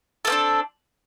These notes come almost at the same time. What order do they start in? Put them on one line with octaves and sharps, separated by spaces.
A4 A#3 C4 D4